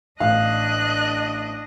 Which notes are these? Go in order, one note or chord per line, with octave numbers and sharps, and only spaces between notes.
A1 D4 D#5 F5 F#6